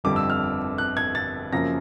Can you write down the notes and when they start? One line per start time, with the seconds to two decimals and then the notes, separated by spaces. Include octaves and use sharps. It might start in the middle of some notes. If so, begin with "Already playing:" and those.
0.04 G1 F2 D3 G3 D6
0.16 E6
0.30 F6
0.78 F#6
0.97 G#6
1.15 A6
1.53 F#2 C#3 F3 A#3 A#6